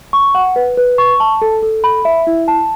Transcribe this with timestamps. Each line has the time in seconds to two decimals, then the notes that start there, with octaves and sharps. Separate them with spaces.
0.13 C#6
0.35 F#5
0.56 B4
0.77 B4
0.98 C#6
1.20 A5
1.42 A4
1.62 A4
1.84 B5
2.05 E5
2.27 E4
2.48 A5